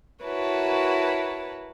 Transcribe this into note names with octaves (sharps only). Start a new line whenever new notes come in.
E4 F#4 A#4 B4 C#5 A5